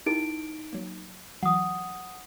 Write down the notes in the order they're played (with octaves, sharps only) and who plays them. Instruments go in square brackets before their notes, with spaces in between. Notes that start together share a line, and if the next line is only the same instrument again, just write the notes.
[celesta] D#4 D7 [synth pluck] E4 G4 A#4
[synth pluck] F#3 A#3
[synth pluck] E3 F#3 [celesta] F#5 D#6